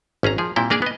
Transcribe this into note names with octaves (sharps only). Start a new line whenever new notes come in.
G#1 C#4 G#4 A#5
F3 G#4
A#2 G3 C4 E4 G5
A#3 D4 G#4 A#4 D5
B3 D#5